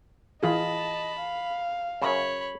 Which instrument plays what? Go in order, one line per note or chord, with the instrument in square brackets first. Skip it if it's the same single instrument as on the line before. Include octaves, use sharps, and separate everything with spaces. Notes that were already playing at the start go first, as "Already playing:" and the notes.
[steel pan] E3 F4 G#4 [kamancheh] D#5 A5 [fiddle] B5
[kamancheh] F5
[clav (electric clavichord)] F#2 C#3 [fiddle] C#5 B5